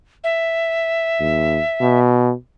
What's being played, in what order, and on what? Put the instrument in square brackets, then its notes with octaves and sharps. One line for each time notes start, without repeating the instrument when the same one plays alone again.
[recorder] E5
[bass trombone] D#2
B2